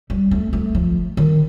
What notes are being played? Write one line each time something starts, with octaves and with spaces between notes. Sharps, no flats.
G3
A3
A3
F3
D#3